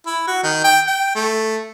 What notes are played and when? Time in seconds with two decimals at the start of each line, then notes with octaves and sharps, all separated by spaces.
0.07 E4
0.27 F#4
0.43 D#3
0.64 G5
0.88 G5
1.16 A3